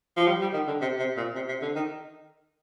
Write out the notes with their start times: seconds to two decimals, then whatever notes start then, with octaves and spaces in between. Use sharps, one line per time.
0.17 F3
0.27 G3
0.41 G3
0.53 D#3
0.67 D3
0.81 C3
0.98 C3
1.17 A#2
1.35 C3
1.48 C3
1.62 D3
1.75 D#3